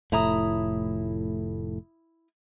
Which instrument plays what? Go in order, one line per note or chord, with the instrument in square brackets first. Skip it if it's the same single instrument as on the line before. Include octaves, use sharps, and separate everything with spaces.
[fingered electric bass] F1 A2 [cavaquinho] E4 A#5 D#6